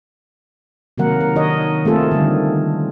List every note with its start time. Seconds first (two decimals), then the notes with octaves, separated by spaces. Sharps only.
0.98 C3 D#3 F#3 A#3 A#4 F#5
1.21 A#4
1.36 D#3 D4 A#4 C#5 D#5
1.85 A3 A#3 C4 F4 G#4 A4
2.11 D3 D#3 G3